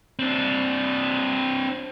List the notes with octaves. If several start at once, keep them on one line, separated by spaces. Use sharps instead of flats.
C4 D4